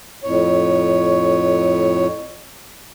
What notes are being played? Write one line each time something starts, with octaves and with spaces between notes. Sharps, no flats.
F2 A2 C#5